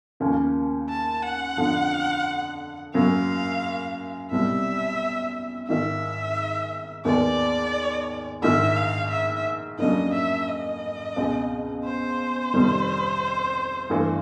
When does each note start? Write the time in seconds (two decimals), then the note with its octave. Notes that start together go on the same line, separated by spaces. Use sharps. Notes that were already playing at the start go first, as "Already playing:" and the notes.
0.20 D#2 C#3 F3 A#3 C#4
0.89 A5
1.23 F#5
1.57 F2 D3 F3
2.94 F#2 C#3 F#3 A#3 C#4 F5
4.31 C2 B2 G3 C4 E5
5.68 G#1 G#2 D#3 E5
7.05 D#2 D#3 G#3 B3 D5
8.42 A#1 G#2 D#3 E5
8.76 F5
9.11 E5
9.79 F2 C#3 F#3 A#3 D4 D#5
10.14 E5
10.48 D#5
11.16 C#2 B2 G#3 C4
11.84 C5
12.54 F2 C3 D#3 G3
13.90 G2 E3 A3